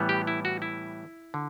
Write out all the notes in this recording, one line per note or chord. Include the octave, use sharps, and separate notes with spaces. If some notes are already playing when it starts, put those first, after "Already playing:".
Already playing: A2 E3 G3 B3
G4
E4
F#4
E4
D3